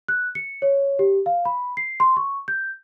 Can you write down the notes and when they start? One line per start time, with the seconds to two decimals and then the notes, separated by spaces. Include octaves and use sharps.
0.08 F#6
0.35 C#7
0.62 C#5
0.99 G4
1.26 F5
1.45 B5
1.77 C7
2.00 C6
2.17 C#6
2.48 G6